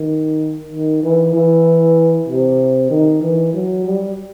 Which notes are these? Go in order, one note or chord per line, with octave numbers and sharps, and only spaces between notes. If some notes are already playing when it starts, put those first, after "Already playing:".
Already playing: D#3
D#3
E3
E3
C3
D#3
E3
F#3
G3